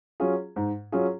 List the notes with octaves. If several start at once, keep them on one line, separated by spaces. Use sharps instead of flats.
F#3 C#4 F4 G#4
G#2
F#3 C#4 F4 G#4